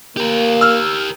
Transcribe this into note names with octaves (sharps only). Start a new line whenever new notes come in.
A#3 G4 A#4
E6 F6